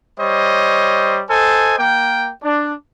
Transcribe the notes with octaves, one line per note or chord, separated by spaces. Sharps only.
G3 C5 C#5 D#5
A4 C5 D#5 G#5
A#3 G5
D4